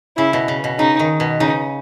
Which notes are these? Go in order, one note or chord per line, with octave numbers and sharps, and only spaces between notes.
C#3 E4
B2
C#3
B2
C#3 D#4
D#3
B2
C#3 D#4